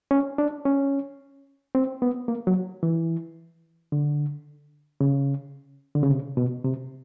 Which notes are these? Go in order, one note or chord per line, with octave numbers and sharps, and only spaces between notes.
C#4
D4
C#4
C4
B3
A#3
F#3
E3
D3
C#3
D3
C#3
C3
B2
C3